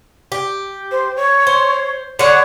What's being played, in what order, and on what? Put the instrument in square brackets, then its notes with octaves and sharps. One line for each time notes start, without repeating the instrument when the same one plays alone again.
[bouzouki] G4
[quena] C5
C#5
[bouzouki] C5
[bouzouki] D3 F#5 [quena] C#5